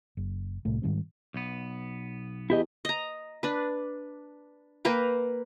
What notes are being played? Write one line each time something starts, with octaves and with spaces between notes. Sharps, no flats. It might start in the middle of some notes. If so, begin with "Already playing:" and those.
F#1
C2 A2 C3 A3
G#2 D#3 G3 C4
B1 B3
E2 E4 G4 D#5
D#5 A#5
D4 B4
A#3 A#4 B4 G5